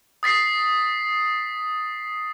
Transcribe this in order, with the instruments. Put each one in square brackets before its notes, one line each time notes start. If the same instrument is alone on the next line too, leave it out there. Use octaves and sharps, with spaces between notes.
[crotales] D#6 A6 B6 C7